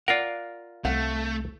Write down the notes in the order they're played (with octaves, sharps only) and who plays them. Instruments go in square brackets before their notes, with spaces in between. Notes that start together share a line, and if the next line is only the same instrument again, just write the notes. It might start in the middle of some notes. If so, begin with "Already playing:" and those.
[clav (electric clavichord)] F4 A#4 [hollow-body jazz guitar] D5 F5 F#5
[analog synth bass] C2 [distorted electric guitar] A3 [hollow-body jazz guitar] C4 F5 F#5